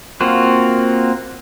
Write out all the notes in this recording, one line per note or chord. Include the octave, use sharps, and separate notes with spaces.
A#3 C4 F4 F#4